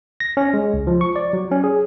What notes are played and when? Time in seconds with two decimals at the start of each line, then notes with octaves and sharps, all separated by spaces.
0.20 A#6
0.37 C#4
0.54 G#3
0.74 C#2
0.87 F3
1.01 C#6
1.16 D5
1.33 F#3
1.51 C#4
1.64 G#4